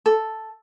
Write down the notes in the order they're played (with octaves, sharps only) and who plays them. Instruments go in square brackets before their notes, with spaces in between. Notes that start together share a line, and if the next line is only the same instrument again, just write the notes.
[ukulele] A4